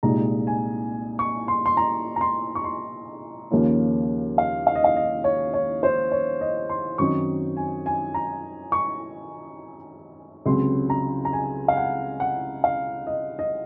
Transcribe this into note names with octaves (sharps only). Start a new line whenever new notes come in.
C2 A#2 G#3 D#4 A#5
G#5
C#6
C6
C6
A#5
A#5
C6
C#6
C6
D#2 C#3 F3 A#3 C#4
F5
F5
D#5
F5
D#5
C#5
C#5
C5
C#5
D#5
C6
F#2 D#3 F#3 C4 D#4 C#6
G#5
G#5
A#5
C#6
C#2 C3 F#3 C4 C6
A#5
A#5
G#5
F5
F#5
F#5
F5
D#5
D#5